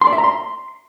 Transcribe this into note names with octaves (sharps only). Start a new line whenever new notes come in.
C6
D5
E5
A#5
C6